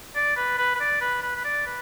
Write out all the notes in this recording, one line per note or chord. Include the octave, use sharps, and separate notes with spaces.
D5
B4
B4
B4
D5
B4
B4
B4
D5
B4